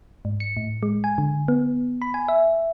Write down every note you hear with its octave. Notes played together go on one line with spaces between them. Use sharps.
G#2
C#7
A2
G#3
G#5
D3
B3
B5
G#5
E5